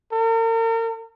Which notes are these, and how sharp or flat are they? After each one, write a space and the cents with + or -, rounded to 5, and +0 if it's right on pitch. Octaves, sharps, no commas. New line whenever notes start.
A#4 -40